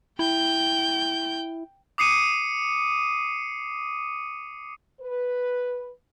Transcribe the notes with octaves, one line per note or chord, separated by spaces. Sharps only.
E4 G5 G6
D6 D#6 C7 C#7 D#7
B4